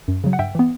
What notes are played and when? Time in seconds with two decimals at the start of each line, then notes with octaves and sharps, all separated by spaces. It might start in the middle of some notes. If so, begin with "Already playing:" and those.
0.08 F#2
0.24 C#3 F#3
0.33 F#5
0.39 G2 E5 G5
0.55 E3 B3